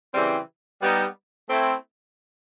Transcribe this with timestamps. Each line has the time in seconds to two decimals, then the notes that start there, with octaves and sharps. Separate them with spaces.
0.14 C#3 E3 G3 C4
0.81 G3 B3 D#4
1.49 A3 C4 E4